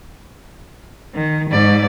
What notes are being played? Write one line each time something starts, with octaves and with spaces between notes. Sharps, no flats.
D#3
G#2 D5